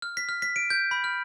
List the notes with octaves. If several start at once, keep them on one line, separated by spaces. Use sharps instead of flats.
F6
B6
F6
B6
D7
G6
B5
F6